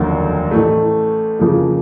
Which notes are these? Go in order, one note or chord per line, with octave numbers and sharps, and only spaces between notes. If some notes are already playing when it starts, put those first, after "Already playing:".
Already playing: F1 D#2 D3 F#3 A#3
A1 A2 E3 A3
F2 C#3 F3 A#3